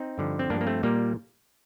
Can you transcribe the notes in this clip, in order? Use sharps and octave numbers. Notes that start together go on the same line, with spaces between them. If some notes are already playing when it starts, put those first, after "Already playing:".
Already playing: C4 D#4
G2 D3 F3
C4
G2 F3 A#3 D4
A#3
A3 C4
A#2 G3 A#3